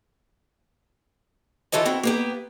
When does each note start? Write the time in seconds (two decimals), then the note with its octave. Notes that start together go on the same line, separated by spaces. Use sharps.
1.72 E3 F4 A4 C#5 D#5
1.85 C4 E4 F#4
2.03 A#3 B3 G4